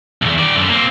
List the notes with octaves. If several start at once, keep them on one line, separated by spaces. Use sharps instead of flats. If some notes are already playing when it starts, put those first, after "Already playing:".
B1 E2
D#3 D5
F#2 D3
A#3 C4